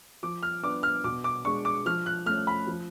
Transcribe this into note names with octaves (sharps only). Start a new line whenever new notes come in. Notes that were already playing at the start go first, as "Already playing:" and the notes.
F3 D6
F6
B3 D4 D6
F6
B2 D6
D6
G#3 D4 C#6
D6
F3 F6
F#6
A3 C#4 F6
B5
F3